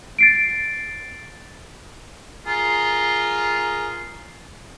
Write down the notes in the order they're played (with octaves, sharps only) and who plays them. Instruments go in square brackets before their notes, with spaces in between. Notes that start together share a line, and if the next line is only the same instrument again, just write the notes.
[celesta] A6 C7 D7
[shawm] F4 [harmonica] G#4 A#4